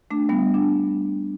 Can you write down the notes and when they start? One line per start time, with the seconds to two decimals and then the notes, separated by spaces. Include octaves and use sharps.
0.11 A3 D4
0.29 G3 B3
0.54 D4